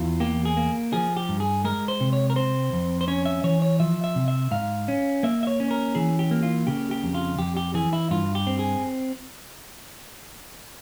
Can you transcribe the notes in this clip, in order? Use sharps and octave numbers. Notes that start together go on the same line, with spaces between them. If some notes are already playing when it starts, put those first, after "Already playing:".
Already playing: E2 E3 F4
A#3 G4
G#4
A#3
F3 G#4
G4
G2
G#4
G#3 A#4
C5
C3
C#5
A#4
C4 C5
F2
C5
C#4 C#5
E5
E3 C#5
C#5
F3 E5
E5
C3
E5
G#2 F5
C#4
A#3 E5
E5
C#5
C#4
A#4
E3 G#4
G4
A#3
F4
C#3 G4
G4
F2
F4
F2 G4
G4
E3 G#4
E4
G2 F4
G4
C4
G#4